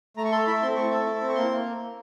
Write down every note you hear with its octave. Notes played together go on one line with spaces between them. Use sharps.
A3 A#5
C#6
A4 C6
E4 B5
C4 C6
A3 C#6
A4
E4
C4
C#6
A#3 C6
A#3